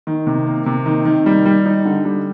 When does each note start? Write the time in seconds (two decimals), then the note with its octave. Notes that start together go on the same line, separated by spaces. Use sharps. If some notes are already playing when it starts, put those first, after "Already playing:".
0.07 D#3
0.27 C3
0.47 A#3
0.66 C3
0.86 D#3
1.05 D#3
1.26 G3
1.45 G3
1.66 D#4
1.85 D3
2.05 G3